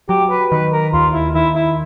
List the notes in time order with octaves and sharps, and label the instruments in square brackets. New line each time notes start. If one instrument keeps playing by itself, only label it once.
[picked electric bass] F#3 [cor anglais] G4
[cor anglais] B4
[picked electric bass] D#3 [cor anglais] B4
[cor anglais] A#4
[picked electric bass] D#2 [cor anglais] F4
[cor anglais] E4
[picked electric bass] D#3 [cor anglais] E4
[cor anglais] E4